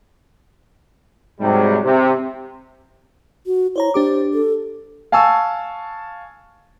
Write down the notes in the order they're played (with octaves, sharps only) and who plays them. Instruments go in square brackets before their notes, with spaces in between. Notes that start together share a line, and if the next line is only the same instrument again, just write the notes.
[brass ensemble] G#2 C3 F#3 G3
C3
[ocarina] F#4
[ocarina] E4 [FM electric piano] C5 C#5 A#5
[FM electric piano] D4 G4 D6 [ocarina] C5
[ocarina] A4
[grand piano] F5 G#5 A5 C#6 E6